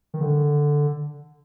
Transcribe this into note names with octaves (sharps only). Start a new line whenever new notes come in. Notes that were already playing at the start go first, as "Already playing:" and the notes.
D#3
D3